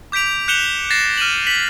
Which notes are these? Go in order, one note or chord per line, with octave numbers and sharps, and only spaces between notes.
D6 G6 B6 D7 F7
F#6 G6 C#7 E7 F7 G7
A6 A#6 C7 E7
F6 D#7 E7 F#7
B6 F#7